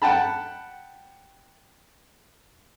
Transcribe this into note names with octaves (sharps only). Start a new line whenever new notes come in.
F#5 G5 A5 B5